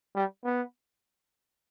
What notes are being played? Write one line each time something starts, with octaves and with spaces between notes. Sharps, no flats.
G3
B3